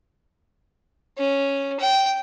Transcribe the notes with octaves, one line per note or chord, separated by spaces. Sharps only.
C#4
G5